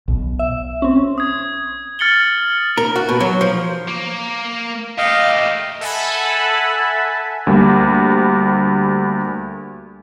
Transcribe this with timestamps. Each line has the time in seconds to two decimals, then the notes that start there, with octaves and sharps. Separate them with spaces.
0.08 B1 B2
0.39 E5
0.82 C4 C#4
1.18 D#6 G#6
1.99 F6 A6 C#7 F#7 G7
2.77 A#4
2.96 F#4
3.09 B2
3.20 F#3
3.41 F3
3.88 A#3
4.98 A3 G4 D#5 F5
5.81 A4 E5 F#5 G#5 A5 B5
7.47 D2 G3 A#3